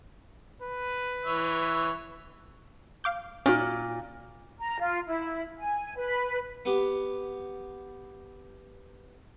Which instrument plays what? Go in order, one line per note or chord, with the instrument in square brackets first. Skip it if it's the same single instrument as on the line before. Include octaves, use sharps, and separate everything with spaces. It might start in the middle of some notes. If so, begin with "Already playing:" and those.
[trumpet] B4
[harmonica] E3 C#5 E5
[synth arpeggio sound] F5 D6 G6
[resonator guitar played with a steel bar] A#2 [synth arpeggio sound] C#4 D#4 F#4
[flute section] A#5
F4
E4
G#5
B4
[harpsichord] B3 G4